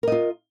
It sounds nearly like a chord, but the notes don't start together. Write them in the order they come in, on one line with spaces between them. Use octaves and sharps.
A#4 D#5 F4